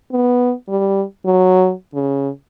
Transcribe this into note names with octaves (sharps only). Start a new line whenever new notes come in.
B3
G3
F#3
C#3